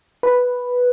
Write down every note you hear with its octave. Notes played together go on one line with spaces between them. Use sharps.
B4